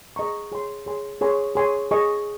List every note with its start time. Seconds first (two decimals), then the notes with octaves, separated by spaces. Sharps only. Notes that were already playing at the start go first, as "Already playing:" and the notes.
0.16 G#4 D#5 A#5 C#6
0.52 G#4 C#5 G#5 C6
0.86 G#4 C#5 G#5 C6
1.21 G#4 C#5 G#5 C6
1.55 G#4 C#5 G#5 C6
1.91 G#4 D#5 G#5 C#6